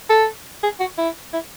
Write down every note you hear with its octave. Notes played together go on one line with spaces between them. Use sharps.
A4
G#4
F#4
E4
E4